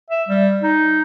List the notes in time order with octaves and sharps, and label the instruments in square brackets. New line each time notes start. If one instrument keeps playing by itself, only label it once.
[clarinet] E5
G3
D#4